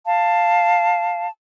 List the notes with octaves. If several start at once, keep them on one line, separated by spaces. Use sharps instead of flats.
F5 A5